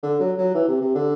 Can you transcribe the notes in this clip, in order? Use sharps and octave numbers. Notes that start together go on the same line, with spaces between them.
D3
F#3
F#3
E3
C3
C3
D3